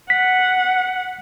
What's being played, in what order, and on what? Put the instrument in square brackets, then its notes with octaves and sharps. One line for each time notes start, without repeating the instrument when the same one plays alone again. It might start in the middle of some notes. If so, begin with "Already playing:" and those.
[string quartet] F#5 [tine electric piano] B6